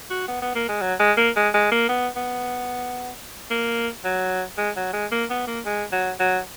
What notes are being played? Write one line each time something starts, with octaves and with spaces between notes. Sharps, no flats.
F#4
B3
B3
A#3
G#3
F#3
G#3
A#3
G#3
G#3
A#3
B3
B3
A#3
F#3
G#3
F#3
G#3
A#3
B3
A#3
G#3
F#3
F#3